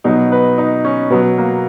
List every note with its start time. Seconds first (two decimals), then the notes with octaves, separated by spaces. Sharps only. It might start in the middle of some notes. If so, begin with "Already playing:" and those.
0.04 B2 F#3 D#4
0.32 B4
0.58 D#4
0.85 C#4
1.10 B2 F#3 B3
1.38 A#3